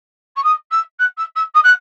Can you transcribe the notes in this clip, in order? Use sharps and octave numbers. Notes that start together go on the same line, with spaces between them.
C#6
D#6
E6
F#6
E6
E6
D#6
F#6